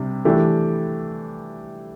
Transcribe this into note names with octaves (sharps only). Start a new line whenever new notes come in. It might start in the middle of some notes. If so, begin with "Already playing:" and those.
Already playing: C3 G3 D4 G4
E3 A3 D4 G4